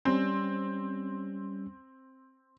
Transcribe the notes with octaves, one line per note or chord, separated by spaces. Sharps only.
G3 C4 C#4